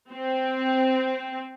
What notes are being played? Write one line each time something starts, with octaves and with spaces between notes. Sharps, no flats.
C4